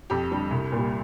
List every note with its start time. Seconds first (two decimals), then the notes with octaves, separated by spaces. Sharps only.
0.10 F2 G4
0.32 D3 G3
0.51 C2
0.72 A#2 G3